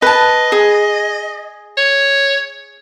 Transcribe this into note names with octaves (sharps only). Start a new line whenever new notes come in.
B4 D#5 A5
G#4
C#5